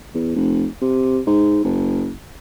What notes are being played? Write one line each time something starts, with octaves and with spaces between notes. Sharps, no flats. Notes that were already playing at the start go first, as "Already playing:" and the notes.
E2
F1
C3
G#2
F#1